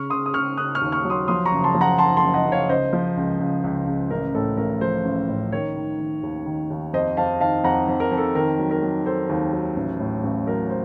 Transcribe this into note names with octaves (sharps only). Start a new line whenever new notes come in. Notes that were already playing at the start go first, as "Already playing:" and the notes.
Already playing: C#3 C#6 F6
C#3 C6 D#6
D#6
C#3 C#6 F6
C#3 D#6 F#6
C#6 F6
D#2
C#6 F6
F#3
C6 D#6
F3 C6 D#6
A#5 C#6
F#1
A5 C6
F3
F#5 A#5
F#1 A5 C6
A5 C6
F#1
D#5 F#5
F#1
C#5 F5
C#2 C5 D#5
F3
C#2
C#2
C#2
C#2
A1 A#4
A2 A4
A1 A#4
F3 A4 C5
A1
A2
D#3 A#4 C#5
D#3
D#3
D#2
D#3
D#2
F2 C5 D#5
F2 F5 A5
D#3 F5 A5
F2 F#5 A#5
F2
A#4
F2
A4
D#3 A#4
F#3
A#4
F#3
D#3 A4 C5
D#2
F#3
A1
A2
A1
F#3 A#4
C5